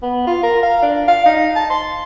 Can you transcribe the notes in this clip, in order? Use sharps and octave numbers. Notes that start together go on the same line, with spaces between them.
B3
F4
A#4
F5
D4
F5
D#4
A5
C6